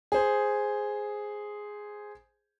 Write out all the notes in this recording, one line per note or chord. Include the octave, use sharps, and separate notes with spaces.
G#4 C5